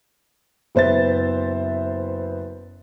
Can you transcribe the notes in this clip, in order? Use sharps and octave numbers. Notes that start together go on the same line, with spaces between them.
F#1 B3 C5 E5 A6